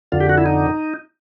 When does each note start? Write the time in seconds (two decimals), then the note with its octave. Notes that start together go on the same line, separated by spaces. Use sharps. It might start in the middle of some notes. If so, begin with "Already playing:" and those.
0.12 F2 D3 F4
0.20 G4
0.29 F#4
0.38 E4
0.46 D#4